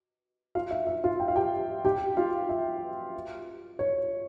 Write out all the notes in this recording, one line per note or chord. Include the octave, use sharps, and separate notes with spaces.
F4 F5
E5
E5
F4 F5
G5
F5
G4 G5
G4 G5
F4 F5
E5
C#5